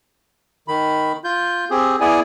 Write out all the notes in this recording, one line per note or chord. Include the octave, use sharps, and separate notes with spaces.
D#3 B5
F4 G6
C4 G4 G#4
B3 E4 G#4 D5 G#5